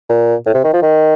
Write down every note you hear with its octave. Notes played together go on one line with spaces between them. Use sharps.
A#2
A2
C3
D#3
F3
D#3